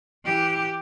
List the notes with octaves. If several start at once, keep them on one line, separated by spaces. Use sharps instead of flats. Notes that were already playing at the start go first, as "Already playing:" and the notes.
E3 G4